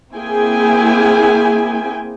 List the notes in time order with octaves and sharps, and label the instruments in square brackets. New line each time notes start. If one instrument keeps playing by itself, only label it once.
[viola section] A#3 C4 E4 G#4 G5 G#5